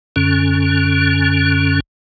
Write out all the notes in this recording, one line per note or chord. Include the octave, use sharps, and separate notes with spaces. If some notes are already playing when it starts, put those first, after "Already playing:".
F#2 D3 C#4